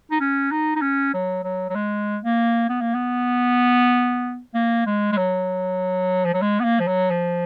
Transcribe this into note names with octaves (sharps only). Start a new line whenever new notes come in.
D#4
C#4
D#4
D#4
C#4
F#3
F#3
F#3
G#3
A#3
B3
A#3
B3
A#3
G#3
G#3
F#3
F3
F#3
G#3
B3
A#3
F3
F#3
F3